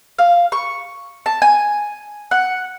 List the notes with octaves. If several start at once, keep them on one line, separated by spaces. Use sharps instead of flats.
F5
C#6
A5
G#5
F#5